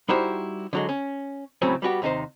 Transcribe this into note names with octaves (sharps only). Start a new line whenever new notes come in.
G3 D#4 E4 F#4 G4 C5
D3 F#3 G#3
C#4
C#2 A2 F#3 A3 C4 C#4
G3 B3 F#4 G4
D#2 C3 D#4 G#4 C5